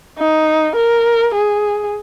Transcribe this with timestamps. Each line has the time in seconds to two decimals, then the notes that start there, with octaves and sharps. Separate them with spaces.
0.18 D#4
0.76 A#4
1.34 G#4